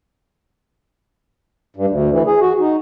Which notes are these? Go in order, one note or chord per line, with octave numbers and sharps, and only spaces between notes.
G2
D2
E3
G#4
F#4
D#4